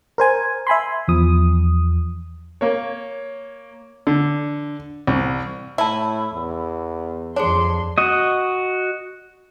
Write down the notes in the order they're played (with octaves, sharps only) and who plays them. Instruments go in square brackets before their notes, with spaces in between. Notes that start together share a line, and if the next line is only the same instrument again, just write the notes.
[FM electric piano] A#4 C5 G#5
E5 G#5 B5 C6
E2 F3 D#6
[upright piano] A#3 C#5
[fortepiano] D3
C2
[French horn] A2 [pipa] E4 [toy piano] E5 A5
[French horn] E2
[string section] F2 C6 [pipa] D4 [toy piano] G#4 C5 C#5
[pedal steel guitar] F#4 D#5